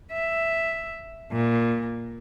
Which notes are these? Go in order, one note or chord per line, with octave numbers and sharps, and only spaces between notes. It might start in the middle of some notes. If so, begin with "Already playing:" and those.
E5
A#2